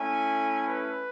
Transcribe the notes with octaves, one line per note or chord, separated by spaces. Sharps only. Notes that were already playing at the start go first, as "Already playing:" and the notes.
Already playing: A3 C#4 E4 G#5
B4